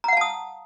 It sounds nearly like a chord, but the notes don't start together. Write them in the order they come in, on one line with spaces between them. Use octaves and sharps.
A#5 F#5 F5 A5 D#6